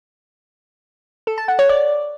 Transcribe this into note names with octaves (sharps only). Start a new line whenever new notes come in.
A4
A5
F#5
C#5
D5